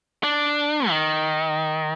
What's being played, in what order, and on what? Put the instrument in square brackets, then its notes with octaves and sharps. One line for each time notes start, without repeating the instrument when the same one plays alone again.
[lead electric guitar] D4
D#3